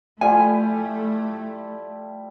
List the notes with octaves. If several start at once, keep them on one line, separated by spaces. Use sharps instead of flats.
F3 G3 A3 E4 G#5